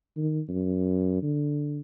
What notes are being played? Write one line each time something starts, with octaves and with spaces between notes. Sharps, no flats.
D#3
F#2
D3